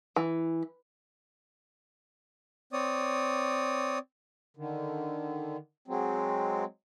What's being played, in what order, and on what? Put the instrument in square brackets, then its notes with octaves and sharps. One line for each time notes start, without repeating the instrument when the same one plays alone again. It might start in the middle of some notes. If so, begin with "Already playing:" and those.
[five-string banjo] E3
[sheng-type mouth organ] C4 C#5 D5 D#6
[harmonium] D3 D#3
F#3 G#3 C4